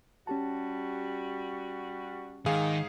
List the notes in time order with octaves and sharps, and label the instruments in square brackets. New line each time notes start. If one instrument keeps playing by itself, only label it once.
[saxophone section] G3 F#4 [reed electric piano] C#4 G4 A5
[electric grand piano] G#2 G#4 F5 [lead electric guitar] D#3